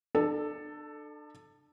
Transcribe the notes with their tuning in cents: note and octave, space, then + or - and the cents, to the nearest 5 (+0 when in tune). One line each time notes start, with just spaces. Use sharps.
D4 +30 A4 +0